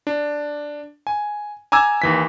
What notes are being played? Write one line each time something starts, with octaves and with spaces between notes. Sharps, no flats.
D4
G#5
G#5 A#5 D6 E6 G#6
D#2 E3 B6